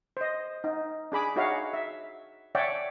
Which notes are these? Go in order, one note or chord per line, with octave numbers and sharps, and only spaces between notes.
C5 D#5
D#4
D4 G#4 B5 D6
D#4 F#4 G#4 C#5 E5 F5
E5
C#5 D5 E5 F#5 G5